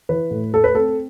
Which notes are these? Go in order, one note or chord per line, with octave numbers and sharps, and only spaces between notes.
E3 B4
A2
A3 A4
B4
C4 A4